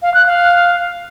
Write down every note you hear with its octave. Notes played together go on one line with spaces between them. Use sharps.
F5
F#6
F5